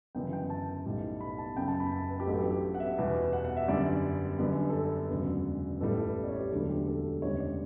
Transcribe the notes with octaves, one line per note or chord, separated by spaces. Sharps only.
G1 F#2 C#3 E3 G5
G5
A5
B1 A2 G3
B5
A5
F#1 F#2 C#3 G5
A5
B5
A5
B4
G4
A1 G2 F#3 A4
G4
G4
F#5
E5
E2 B2 G3
F#5
F#5
E5
G1 F#2 D3 G3 D5
G1 F#2 D3 G3 B4
A4
B4
E1 D2 C#3 F#3
A1 A2 G3 A4
A4
B4
D5
C#5
G4
E1 D2 D3 F#3 A4
G4
A4
A4
E1 D2 C#3 G3 C#5
D5